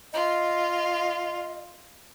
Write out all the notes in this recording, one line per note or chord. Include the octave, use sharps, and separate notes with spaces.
F4 D#5